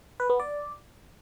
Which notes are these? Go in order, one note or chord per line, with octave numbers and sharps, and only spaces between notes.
B4
B3
D5